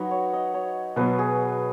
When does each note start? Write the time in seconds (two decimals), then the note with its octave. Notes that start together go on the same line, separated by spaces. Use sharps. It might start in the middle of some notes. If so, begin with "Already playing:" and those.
Already playing: F#3 D#4 F#4 B4
0.11 C#5
0.33 D#5
0.54 C#5
0.96 B2 F#3 B3 B4
1.19 G#4